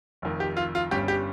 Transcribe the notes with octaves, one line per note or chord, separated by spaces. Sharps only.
F1 F2 D#3
G4
F4
F4
G1 G2 G3 C#4 G4
G4